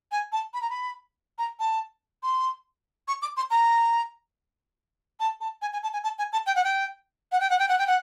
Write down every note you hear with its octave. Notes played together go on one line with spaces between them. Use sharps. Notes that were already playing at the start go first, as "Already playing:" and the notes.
G#5
A5
B5
A#5
B5
A#5
A5
C6
C#6
D6
C6
A#5
A5
A5
G#5
G#5
A5
G#5
A5
G#5
A5
G5
F#5
G5
F#5
G5
F#5
G5
F#5
G5
F#5